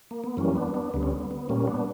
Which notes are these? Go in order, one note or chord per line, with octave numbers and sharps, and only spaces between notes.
A#3
B3
F#2 E3 G3 A#3 C#4
B3 D4
B3 D4
D2 D3 G3 B3
C#4
B3
B3
A#2 G3 A#3 C#4
B3 D4